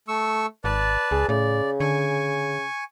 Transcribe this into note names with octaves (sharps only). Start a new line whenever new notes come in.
A3 C#6 E6
G#1 B4 D5 A5
C#2 G#4
A2 C#3 D5
D3 G#5 C#6